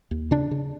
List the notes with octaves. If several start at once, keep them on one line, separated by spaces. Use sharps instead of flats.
D#2
C#3 D4
C#3